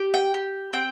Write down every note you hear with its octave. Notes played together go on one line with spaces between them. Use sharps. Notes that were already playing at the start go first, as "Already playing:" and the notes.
Already playing: G4
G5
G4
C4 G5